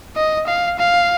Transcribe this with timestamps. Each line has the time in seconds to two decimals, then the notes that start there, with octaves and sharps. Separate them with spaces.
0.16 D#5
0.47 F5
0.78 F5